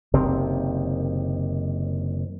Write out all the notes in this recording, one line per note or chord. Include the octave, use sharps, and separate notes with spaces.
F#1 C3 D#3 C4